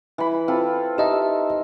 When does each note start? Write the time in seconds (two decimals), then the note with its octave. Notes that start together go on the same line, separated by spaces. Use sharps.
0.18 E3 B5
0.48 C4 F4 A4
0.98 D#4 G4 D#5 E5 A5